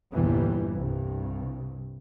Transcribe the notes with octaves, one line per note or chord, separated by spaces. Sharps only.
G1 E2 A#2 E3 G3
C2 G2